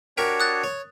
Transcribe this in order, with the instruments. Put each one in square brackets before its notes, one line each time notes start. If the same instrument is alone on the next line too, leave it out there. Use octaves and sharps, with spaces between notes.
[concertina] D4 F#4 C#5 [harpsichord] G4 A#4 C#6
[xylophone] D#6 F#6 A6
[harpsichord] C#5